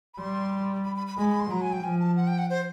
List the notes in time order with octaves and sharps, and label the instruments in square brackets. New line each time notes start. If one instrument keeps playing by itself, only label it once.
[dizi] B5
[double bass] G3 [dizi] C6
[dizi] B5
B5
B5
[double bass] G#3 [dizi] B5
[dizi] B5
C6
[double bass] F#3 [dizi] A#5
[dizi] G#5
G5
[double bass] F3 [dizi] G#5
[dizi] A5
F#5
G5
F#5
C5